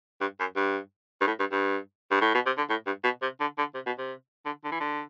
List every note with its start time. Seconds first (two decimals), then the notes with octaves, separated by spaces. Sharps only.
0.21 G2
0.40 F#2
0.56 G2
1.21 G2
1.27 A2
1.39 G2
1.52 G2
2.11 G2
2.21 A2
2.34 B2
2.46 C3
2.58 D3
2.70 A2
2.86 G2
3.04 B2
3.22 C3
3.40 D3
3.58 D3
3.75 C3
3.86 B2
3.99 C3
4.45 D3
4.64 D3
4.72 E3
4.80 D3